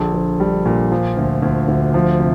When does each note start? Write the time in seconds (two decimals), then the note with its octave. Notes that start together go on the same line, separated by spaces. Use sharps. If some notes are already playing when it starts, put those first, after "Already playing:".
Already playing: A#1 D3
0.14 A#1
0.40 G3
0.66 A#2
0.92 F3
1.17 D2
1.42 D2
1.68 D2
1.94 F3
2.20 C3